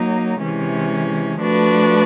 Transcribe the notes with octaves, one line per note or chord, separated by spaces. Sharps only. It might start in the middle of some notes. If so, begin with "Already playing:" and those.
Already playing: F#3 A#3 D#4
C3 E3 G#3 C#4
F3 A3 D4 F#4 B4